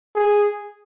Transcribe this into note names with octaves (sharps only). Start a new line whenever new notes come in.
G#4